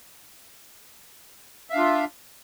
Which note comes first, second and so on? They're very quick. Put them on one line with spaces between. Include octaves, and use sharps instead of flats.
E5 F5 D4 F4